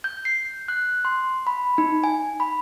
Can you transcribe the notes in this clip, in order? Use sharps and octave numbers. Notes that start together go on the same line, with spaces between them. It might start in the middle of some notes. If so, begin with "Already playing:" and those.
G6
C7
F#6
C6
B5
D#4
G#5
B5